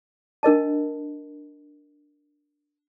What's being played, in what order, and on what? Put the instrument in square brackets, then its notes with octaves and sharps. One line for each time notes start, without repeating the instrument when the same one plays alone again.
[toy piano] D4 A#4 D#5 A5